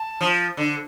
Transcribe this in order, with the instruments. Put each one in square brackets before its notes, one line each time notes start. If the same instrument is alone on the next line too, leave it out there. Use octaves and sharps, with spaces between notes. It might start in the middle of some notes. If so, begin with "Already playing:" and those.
Already playing: [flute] A5
[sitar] F3
D3